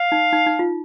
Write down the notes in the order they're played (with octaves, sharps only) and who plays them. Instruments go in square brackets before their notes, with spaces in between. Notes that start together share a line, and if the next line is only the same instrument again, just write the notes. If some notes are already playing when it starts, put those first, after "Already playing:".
Already playing: [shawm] F5
[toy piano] D#4
D#4
D#4
F4